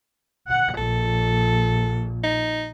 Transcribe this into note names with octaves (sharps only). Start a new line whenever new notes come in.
F#5
A#1 A4
D#4